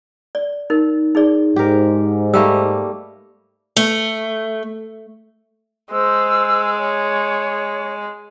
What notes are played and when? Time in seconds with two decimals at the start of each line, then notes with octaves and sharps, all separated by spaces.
0.35 D5
0.70 D#4 A#4
1.15 D#4 G#4 D5
1.56 G#2 G4 A#4
2.34 G3 A3 A#3 E6
3.77 A3
5.92 G#3 C5 E6
6.78 C#5